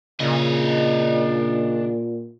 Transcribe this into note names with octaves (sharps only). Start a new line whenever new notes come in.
A#2 C#3 D4 D#5